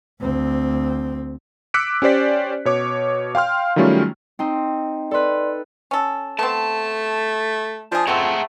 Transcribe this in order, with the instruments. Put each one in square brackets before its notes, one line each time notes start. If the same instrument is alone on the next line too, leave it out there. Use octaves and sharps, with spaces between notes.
[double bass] D2 C4
[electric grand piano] D6 E6 F#6 B6 C#7 D7
C#4 G4 C5 D5 B6
B2 C#5 D6
F5 G5 C6 F6
D#3 F#3 G3 A3 C#4 F4
[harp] C4 D#4
[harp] A4 B4 [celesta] D5 C6
[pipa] C#4 A4
[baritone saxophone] A3 [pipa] B3 C4 [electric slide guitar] A5
[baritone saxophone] F3 [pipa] D4 G#4
[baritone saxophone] F2 [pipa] A3 C4 [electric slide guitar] G#4 F#5 A#5